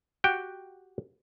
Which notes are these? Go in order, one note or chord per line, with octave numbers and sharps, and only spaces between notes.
F#4 G4 F#5 G5